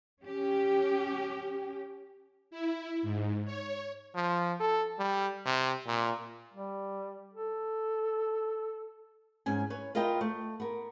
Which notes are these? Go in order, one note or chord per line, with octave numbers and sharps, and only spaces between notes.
C#4 G4
E4
G#2
C#5
F3
A4
G3
C3
A#2
G3
A4
G#2 C#4 G#5
B4 C#5
F4 A#4 B4 D#5 E5 G5
A3
B3 A#4